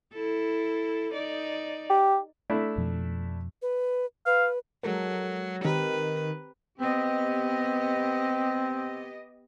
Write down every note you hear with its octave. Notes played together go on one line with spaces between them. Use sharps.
E4 A4
D#4 D5
G4
A3 D4 E4
F2 B2 F3
B4
B4 F5
F#3 G#3 A4 A#4
D#3 C4 G4 A#4 B4
B3 C4 G4 D#5